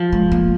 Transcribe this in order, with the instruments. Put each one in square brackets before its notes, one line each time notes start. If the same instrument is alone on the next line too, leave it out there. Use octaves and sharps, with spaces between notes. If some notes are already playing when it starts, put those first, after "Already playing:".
Already playing: [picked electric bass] F3
[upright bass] G#3
A#3